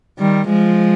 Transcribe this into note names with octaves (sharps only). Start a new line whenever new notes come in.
D#3 G3
F3 G#3